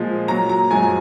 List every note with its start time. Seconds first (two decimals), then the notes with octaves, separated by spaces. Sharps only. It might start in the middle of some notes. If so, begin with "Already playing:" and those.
Already playing: A#2 F3 G#3
0.28 A#2 F#3 A#5
0.49 A#5
0.71 F#2 F3 G#3 G#5